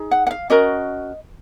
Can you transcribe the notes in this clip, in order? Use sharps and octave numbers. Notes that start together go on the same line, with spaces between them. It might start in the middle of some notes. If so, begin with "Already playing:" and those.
Already playing: D#4 G#4
F#5
F#5
F5
C#4 F#4 A#4 D#5